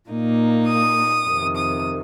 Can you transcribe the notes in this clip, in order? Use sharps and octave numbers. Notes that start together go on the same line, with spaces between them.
A#2 A#3 D#4
D#6
F2 C3 D#3
D#6